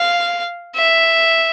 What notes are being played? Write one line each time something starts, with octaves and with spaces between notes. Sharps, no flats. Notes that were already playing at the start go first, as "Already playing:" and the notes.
Already playing: F5
E5